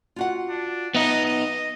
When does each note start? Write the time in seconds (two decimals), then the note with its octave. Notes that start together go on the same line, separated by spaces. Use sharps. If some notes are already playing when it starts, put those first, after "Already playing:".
0.16 F4 F#4 F#5
0.49 D4
0.95 B3 D#4 D#5 E5
1.25 D#5